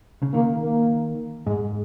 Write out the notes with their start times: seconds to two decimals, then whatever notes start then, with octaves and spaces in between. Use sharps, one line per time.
0.22 C#3
0.34 D#3 A#3
0.63 A#3
1.46 G#2 G#3